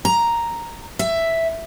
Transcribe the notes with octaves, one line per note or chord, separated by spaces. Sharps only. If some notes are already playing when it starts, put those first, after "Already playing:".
A#5
E5